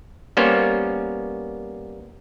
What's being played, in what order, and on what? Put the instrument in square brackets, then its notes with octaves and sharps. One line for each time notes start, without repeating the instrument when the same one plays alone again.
[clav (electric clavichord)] G3 A#3 B3 C#4 C5 C#5